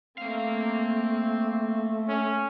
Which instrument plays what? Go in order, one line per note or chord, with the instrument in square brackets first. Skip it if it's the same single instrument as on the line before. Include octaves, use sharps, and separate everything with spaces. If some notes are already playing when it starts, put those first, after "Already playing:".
[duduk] A3 [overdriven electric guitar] A#3 F5 [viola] C4
[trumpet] C#4